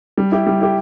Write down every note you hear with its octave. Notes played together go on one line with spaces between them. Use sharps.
G3
E4 G4
G3
E4 G4